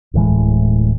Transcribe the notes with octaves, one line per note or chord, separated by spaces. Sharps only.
D1 A2 E3 G#3